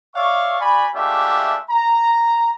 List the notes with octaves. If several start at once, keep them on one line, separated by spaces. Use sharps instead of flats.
C#5 D5 E5 F5 C#6
F#4 D5 G#5 B5
G#3 A3 D4 F4 G4 E5
A#5